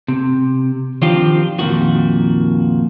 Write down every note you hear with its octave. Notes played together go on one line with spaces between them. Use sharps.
C3
D#3 F3 C4 D4 F4 G4
F2 A#2 D#3 F#4